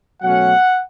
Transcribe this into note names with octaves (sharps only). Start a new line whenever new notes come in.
B2 F#3 A3 C#4 F#5